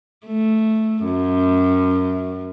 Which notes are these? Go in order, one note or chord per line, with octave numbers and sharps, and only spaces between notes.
A3
F#2